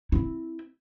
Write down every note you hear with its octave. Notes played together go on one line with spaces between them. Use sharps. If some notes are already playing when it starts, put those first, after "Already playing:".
C4 E4